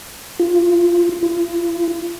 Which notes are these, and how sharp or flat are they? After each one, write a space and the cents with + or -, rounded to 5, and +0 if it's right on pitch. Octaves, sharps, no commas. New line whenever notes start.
F4 -10
F4 -40